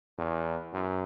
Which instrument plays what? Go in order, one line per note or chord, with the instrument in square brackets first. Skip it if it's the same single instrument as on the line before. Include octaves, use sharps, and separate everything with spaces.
[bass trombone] E2
F#2